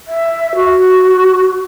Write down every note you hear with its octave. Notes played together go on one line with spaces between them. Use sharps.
E5
F#4